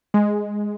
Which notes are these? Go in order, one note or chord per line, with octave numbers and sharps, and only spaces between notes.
G#3